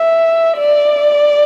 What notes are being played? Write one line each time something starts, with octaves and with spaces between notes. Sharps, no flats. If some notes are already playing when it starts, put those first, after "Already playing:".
Already playing: E5
D5